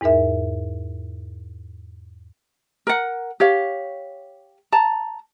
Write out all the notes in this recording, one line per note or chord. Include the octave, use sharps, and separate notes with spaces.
E2 G#2 D#4 A#4 E5
A#4 F#5
G4 C#5 F5
A5 A#5